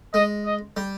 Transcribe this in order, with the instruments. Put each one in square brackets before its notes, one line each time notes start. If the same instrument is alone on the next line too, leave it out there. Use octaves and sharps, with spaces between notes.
[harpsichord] G#3 [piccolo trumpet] D#5
[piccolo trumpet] D#5
[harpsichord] G3